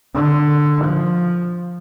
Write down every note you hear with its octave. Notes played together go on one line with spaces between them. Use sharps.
D3
F3